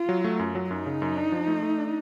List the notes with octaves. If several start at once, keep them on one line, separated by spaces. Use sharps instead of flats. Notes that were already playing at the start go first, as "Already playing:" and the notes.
Already playing: F4
F#3
A3
F#2
F#3
F#2 D#4
C#3
F#2
D4
F3
A3
A3
D4